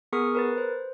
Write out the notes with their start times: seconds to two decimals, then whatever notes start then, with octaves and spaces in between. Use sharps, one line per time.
0.13 B3 G#4 A#4 C#6 D#6 F6
0.35 A#4 B4 A6
0.58 C5